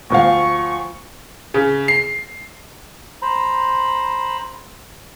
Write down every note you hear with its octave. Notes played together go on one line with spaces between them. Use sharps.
D2 F3 F5 C#6
C#3
C7
C5 A#5 B5